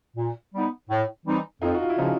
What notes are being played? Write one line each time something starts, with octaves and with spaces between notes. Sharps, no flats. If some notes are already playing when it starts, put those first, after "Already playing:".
A#2
G3 B3 D#4
A2
E3 G3 C4 D#4
F2 D#4 F4
F#4
F4
E4
C#3 F3 C#4 D#4